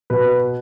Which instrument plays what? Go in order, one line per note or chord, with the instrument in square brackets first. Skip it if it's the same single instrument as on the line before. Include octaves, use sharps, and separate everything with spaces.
[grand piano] B2 B4